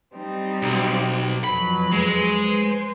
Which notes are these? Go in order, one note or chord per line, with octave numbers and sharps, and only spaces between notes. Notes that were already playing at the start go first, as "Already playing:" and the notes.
G3 C4 D#4
B1
F2 F#3 B4 B5
G#3
B4 C5